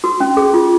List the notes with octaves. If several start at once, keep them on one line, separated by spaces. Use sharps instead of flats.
F#4
C#4
G#4
F4